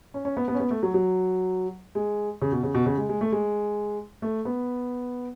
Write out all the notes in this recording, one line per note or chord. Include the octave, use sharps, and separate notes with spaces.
C#4
C#4
B3
B3
C#4
B3
A3
F#3
F#3
G#3
C#3
B2
C#3
B2
C#3
G#3
G#3
A3
G#3
A3
B3